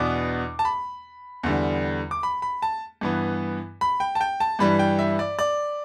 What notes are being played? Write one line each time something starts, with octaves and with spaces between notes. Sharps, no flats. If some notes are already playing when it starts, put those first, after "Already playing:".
Already playing: E2 B2 B3 D4 D6
A5
B5
E2 D3 G3
D6
B5
B5
A5
G2 E3 B3
B5
G5
A5
G5
A5
G2 E3 G3 B5
G5
E5
D5
D5